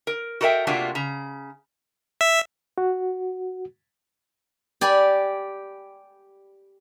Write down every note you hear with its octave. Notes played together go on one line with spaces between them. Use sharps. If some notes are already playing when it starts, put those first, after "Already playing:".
A#4
F#4 A4 A#4 D#5 E5 G5
C3 A3 A#3 D4 F4 F#4
C#3 A#5
E5
F#4
G4 D5 G#5 B5